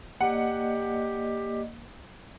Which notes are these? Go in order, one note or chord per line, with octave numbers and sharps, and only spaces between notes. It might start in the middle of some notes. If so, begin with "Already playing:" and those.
A#3 G4 D5 D#5 F#5